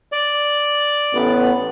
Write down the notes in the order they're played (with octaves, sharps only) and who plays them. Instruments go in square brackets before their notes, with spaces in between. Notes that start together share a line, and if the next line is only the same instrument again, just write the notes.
[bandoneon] D5
[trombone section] A1 B3